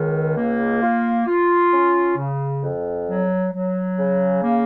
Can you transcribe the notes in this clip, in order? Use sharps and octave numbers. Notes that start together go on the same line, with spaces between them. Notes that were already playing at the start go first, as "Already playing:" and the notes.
Already playing: C#2 D#3
A#3
F4
F4
C#4
C#3
F2
F#3
F#3
C#3
A#3